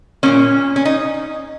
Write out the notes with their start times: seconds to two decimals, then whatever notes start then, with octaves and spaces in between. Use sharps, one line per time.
0.23 A#2 F#3 A#3 C#4
0.76 C#4
0.85 D#4